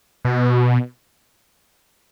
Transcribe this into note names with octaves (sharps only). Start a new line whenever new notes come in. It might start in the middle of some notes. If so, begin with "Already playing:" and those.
B2